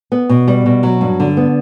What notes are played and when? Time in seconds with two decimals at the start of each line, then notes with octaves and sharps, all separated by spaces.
0.12 B3
0.29 B2
0.48 G3
0.66 B2
0.83 F#3
1.01 G2
1.20 D3
1.37 B3